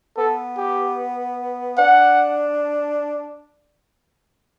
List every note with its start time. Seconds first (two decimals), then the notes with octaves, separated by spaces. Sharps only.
0.17 B3 A4
0.57 G4
1.78 D4 F#5